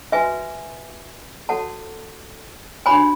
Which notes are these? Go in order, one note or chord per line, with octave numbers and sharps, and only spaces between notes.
F#4 B4 E5 G#5
F#4 A4 C#5 F#5 A5
D4 F#4 C#5 G#5 B5